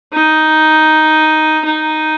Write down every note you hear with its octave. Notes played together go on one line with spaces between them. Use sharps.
D#4
D#4